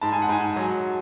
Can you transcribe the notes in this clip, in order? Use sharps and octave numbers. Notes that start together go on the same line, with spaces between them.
G#2 A5
G#5
F#5
G#2 G#5
F#3